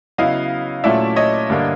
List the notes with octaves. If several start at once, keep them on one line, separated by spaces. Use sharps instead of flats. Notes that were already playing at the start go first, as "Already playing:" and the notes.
C#3 F#3 B3 E4 D#5 F5
A#2 F#3 A3 C#4 E4 D5 E5
C#5 D#5
G2 D3 G3 A#3 D4